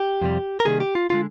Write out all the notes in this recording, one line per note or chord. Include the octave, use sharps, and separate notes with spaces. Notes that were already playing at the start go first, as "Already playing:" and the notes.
Already playing: G4
F2 C3 G3
A#4
C3 D#3 G3 A#3 G#4
G4
F4
D3 G#3 F4